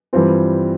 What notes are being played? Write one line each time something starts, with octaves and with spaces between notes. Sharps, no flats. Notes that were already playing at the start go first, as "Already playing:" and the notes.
G2 E3 G3 C4 F4